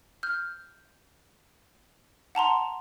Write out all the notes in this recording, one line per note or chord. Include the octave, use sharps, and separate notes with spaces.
F6 G6
F#5 A5 A#5 C6